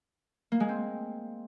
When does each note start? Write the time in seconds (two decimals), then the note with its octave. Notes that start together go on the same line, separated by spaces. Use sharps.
0.52 A#3
0.60 G#3
0.69 C4